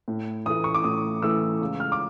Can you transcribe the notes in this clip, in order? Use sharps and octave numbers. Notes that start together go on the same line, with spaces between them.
A2
E3 A3 D#6
C#6
D6
A2 D#6
E3 A3 E6
C#2
F6
D6